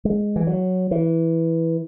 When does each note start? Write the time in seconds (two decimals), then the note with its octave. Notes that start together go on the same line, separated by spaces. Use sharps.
0.05 G#3
0.36 E3
0.47 F#3
0.91 E3